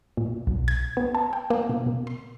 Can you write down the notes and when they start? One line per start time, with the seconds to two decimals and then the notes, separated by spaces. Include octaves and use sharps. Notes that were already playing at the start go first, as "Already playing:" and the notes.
0.17 A#2
0.47 B1
0.68 G#6
0.97 B3
1.15 A5
1.33 G5
1.50 A#3
1.69 B2
1.86 B2
2.07 C6